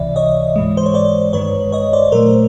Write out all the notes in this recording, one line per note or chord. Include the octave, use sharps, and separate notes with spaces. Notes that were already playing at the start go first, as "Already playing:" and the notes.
Already playing: C#2 C3 E3 D5 E5
C#5 D#5
G#2 E3 G#3
C5
C#5
C5 D5
G2 D#3 G#3 B4 C#5
C#5 D#5
C5 D5
A#2 F#3 A3 A#4 C5